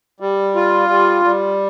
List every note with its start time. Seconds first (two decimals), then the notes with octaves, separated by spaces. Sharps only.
0.20 G3
0.55 F4
0.89 G3
1.24 G3